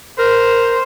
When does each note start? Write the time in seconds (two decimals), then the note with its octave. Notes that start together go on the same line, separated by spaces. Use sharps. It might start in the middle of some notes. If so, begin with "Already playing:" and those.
0.19 A#4 C5